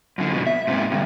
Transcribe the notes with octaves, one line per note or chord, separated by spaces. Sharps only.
F#2 D3
F2 B2
E5
G#2 C3
D2 G2